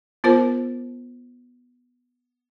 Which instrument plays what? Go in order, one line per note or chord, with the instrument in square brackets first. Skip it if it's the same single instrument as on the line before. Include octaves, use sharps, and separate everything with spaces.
[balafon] B3 F4 A#4 C5